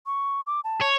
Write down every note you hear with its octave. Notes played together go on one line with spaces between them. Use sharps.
C#6
D6
A5
C#5